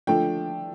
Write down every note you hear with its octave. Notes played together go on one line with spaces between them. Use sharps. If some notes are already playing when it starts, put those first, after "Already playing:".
F3 A3 D4 G5